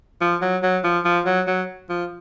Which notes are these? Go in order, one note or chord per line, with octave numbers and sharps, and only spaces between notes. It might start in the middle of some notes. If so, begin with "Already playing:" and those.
F3
F#3
F#3
F3
F3
F#3
F#3
F3